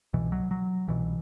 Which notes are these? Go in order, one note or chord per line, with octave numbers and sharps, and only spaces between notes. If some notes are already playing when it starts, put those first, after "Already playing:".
C2 B2 E3
F#3
F#3
C2 B2 E3